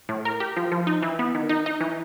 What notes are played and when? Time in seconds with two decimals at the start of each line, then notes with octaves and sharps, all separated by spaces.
0.09 A2
0.25 A#4
0.40 G4
0.57 F3
0.72 F3
0.87 D#4
1.02 E3
1.19 B3
1.35 D#3
1.49 D#4
1.66 D#4
1.81 E3